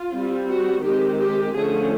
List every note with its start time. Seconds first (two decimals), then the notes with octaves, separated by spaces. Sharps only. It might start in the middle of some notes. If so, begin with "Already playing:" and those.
Already playing: F4
0.12 G3 C4
0.48 F#4
0.83 D#3 G#3 C4 G4
1.19 G4
1.55 D3 F3 A3 C#4 G#4